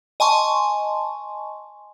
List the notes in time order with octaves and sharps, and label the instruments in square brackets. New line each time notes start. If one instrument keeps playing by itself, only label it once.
[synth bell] D#5 G#5 A5 C6 C#6